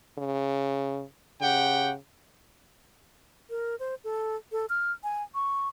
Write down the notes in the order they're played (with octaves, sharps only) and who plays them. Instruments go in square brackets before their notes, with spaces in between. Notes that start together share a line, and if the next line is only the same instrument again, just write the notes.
[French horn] C#3
[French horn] C#3 [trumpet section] G4 F#5 G5
[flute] A#4
C5
A4
A4
F6
G#5
C#6